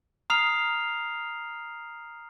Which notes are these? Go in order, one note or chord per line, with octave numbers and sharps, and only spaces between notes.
A#5 D#6 F6 C7 F7